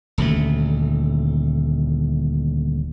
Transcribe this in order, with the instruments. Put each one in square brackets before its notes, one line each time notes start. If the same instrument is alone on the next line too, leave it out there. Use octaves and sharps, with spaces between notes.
[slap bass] D#1 D2 A3